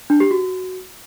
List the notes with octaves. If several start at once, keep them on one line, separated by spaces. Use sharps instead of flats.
D4
G4
F#4